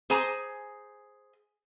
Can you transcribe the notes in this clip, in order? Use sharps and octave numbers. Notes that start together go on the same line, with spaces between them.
G#4 C5 G#5 A#5